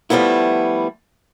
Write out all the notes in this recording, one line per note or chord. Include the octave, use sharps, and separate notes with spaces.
F3 G3 A3 B3 E4